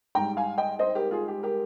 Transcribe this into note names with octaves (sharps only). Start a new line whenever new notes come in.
G#2 G3 G5 A#5
F5 G#5
D#5 G5
C5 D#5
G4 A#4
F4 G#4
G4
G4 A#4